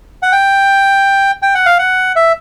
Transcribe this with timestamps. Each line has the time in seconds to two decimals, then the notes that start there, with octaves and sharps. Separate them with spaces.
0.22 F#5
0.32 G5
1.42 G5
1.55 F#5
1.66 F5
1.78 F#5
2.16 E5